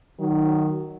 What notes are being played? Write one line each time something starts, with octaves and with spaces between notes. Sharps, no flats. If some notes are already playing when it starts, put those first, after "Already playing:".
D#3 F#3